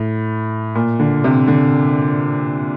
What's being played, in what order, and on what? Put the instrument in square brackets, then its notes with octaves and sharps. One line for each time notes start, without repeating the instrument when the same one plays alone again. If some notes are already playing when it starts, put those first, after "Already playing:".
Already playing: [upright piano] A2
A#2
D3
C3
D3